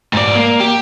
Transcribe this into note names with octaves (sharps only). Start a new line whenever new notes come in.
G#2 D5
A#3
G4